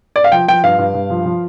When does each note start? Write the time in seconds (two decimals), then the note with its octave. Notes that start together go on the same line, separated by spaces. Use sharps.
0.16 D5
0.24 F5
0.32 F3 G5
0.48 F3 G5
0.63 G2 F5
0.78 G2
0.94 G2
1.10 F3
1.25 F3